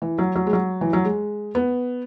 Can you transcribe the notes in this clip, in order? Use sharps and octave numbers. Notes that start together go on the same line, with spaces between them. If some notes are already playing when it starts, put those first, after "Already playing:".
E3
F#3
F#3
G#3
F#3
E3
F#3
G#3
B3